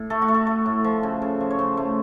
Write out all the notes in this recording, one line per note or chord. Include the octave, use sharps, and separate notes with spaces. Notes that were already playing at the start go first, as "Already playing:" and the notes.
Already playing: A2
A3 A4
F#4
A3
A4
A3
A2
F3
C#3
C#3
F3
C#5
C#3 C5
A3